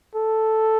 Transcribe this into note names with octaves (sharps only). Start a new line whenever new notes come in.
A4